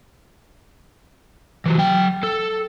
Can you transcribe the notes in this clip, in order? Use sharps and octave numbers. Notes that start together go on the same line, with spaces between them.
E3 F#3
F#3 G5
A4